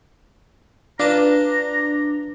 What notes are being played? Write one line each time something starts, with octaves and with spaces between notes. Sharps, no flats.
D4 F4 B4 A5 A#5